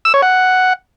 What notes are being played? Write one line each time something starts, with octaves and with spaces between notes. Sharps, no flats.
E6
C#5
F#5